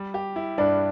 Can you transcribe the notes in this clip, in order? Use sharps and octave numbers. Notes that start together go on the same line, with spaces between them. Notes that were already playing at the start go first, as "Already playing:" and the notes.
Already playing: G3
G4
E4
G2 D4